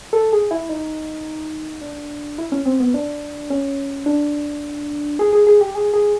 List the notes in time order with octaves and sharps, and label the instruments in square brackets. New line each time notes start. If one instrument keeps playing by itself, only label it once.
[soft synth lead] A4
G#4
E4
D#4
D4
E4
C#4
C4
B3
D4
C#4
D4
G#4
G#4
G#4
G4
G#4
G#4